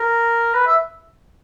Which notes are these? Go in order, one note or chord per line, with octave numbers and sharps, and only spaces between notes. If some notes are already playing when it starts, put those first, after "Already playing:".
Already playing: A#4
B4
E5